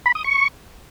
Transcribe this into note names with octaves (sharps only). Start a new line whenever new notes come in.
B5
D#6
C#6